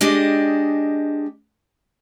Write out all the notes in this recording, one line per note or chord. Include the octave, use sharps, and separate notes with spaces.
G#3 D4 G4 D#5